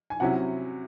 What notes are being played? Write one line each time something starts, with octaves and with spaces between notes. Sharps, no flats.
G#5
C3 F#3 C#4 E4 F#5